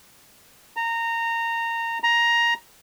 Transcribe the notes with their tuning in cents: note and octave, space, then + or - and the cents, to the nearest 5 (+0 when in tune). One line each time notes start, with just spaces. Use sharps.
A#5 -20
A#5 +10